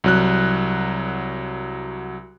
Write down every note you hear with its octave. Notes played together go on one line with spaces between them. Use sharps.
C2 F#3 F#6